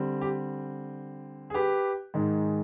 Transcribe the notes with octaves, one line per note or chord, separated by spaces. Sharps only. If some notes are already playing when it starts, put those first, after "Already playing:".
Already playing: D3 G3 C4
G4
G#4
G4 B4
G#2 D#3 G#3